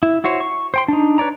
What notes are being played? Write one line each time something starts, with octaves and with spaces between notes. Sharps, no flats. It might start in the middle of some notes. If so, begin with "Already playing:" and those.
E4
E4 F#4 C5 C#5
C#6
C5 G5 C6
D4 D#4
B4 C#5 D5 A#5